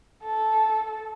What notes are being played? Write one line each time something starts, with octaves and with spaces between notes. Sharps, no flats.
A4